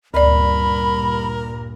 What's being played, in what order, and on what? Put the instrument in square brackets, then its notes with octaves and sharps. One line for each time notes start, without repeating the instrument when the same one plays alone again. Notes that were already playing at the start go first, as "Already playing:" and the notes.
[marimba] D2 D5 [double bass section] G2 A#2 [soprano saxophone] A#4 [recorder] B5